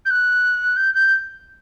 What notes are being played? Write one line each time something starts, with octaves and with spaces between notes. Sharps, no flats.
G6
F#6
G6
G6